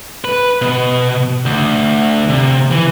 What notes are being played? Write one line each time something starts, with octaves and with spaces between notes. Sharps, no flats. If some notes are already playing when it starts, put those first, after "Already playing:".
B4
B2
D2
C3
E3